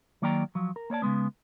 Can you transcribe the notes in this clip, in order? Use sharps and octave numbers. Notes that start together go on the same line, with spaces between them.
D#3 F#3 A#3 D5 G5 A#5
F3 F#3
A#4
A#3 C#5 D5 A5
C#3 F3 G#3 B3